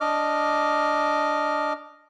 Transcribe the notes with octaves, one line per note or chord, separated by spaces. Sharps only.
D4 D#5 D6 F6